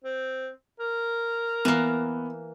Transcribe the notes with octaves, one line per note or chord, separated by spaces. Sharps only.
C4
A#4
E3 A#3 B3